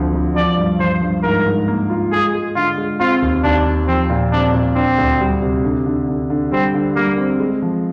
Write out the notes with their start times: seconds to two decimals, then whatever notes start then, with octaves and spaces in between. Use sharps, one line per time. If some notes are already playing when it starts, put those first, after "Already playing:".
Already playing: D2 D3 F3 C4
0.14 D2
0.36 F3 D5
0.57 G2
0.80 F3 C5
1.02 G2
1.23 G#2 A#4
1.46 G#2
1.68 A#3
1.90 F4
2.12 G#3 G#4
2.34 G#3
2.56 D3 F4
2.77 G#3
3.00 C4 F4
3.22 D#2
3.43 D#2 D4
3.66 D#3
3.88 F3 C4
4.10 A#2
4.32 C4 D4
4.54 A#2
4.75 C4 D4
4.98 D2
5.20 G3
5.42 C3
5.64 D3
5.86 D3
6.08 D3
6.30 D3
6.52 G3 C4
6.74 D3
6.96 G3 A#3
7.18 C4
7.40 G#3
7.62 F3